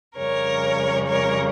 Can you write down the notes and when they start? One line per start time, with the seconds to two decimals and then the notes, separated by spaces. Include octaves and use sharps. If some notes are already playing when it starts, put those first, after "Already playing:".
0.18 F2 C#3 G3 C#4 A#4 C#5
1.07 A#4 C#5